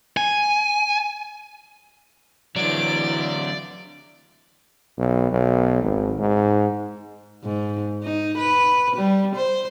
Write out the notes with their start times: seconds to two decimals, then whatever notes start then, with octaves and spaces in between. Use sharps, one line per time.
0.17 G#5
2.57 D3 E3 F#3 D5 D7
4.98 B1
5.32 B1
5.82 G#1
6.19 G#2
7.44 G#2
8.03 D#4
8.38 B4
8.96 G3
9.35 C5